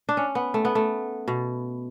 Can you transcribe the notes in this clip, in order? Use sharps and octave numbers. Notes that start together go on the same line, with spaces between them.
D4
C#4
B3
A3
B3
A3
B2